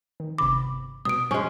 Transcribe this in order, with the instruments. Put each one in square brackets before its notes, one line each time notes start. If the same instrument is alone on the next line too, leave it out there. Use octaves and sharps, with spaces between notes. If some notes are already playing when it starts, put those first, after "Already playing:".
[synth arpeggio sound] D#3
[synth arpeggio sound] G1 C3 B5 [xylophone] D6
[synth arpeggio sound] B2 G3 [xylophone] D#6 D7
[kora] G#3 C#4